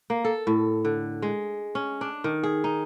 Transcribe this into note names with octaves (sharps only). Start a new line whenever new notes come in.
A#3
A4
A2
D3
G#3
C#4
D4
D#3
G#4
D#4